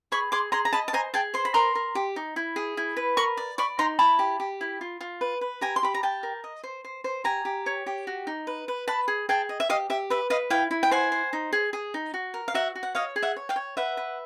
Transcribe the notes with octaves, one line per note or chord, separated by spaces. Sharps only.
G#4 B5 C#6
G#4 C6 D6
G#4 A#5 C6
A#5
D#5 A5 B5
A5
C5 G#5 A#5
G#4 G5 A5
C5 C6
B5
A#4 A#5 C6
A#4
G4
D#4
E4
G#4
E4
B4
A#4 B5 C#6
D5
D5 B5 C#6
D#4 A#5 C6
E4 A5 B5
G4
G4
E4
F4
F4
B4
B4
G4 G#5 A#5
C6
G4 B5
A#5
G4 G5 A5
A#4
D#5
C5
C5
C5
G4 G#5 A#5
G4
C#5
G4
F#4
D#4
B4
B4
B4 A5 B5
G#4
G#4 G5 A5
D#5
E5
G4 D#5 F5
G4 E5
B4 E5
B4 D#5 F5
E4 F5 G5
E4
G5
C5 F#5 G#5
C5
D#4
G#4
G#4
D#4
F#4
A#4
F5
F#4 E5 F#5
F#4
F#5
C#5 D#5 F5
G#4
E5 F#5
C#5
F5 G5
C#5
B4 E5 F#5
B4